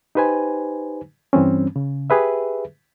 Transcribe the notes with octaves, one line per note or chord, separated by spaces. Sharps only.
D#4 G4 B4 C5 G#5
G2 E3 G3 C4 C#4
C#3
G4 G#4 B4 E5